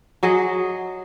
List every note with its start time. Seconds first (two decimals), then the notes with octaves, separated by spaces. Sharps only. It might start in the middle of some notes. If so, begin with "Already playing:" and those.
0.23 F#3 G#4 D#5